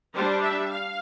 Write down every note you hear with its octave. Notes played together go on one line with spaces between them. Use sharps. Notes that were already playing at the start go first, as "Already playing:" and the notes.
G3 D4 C5
E5
F5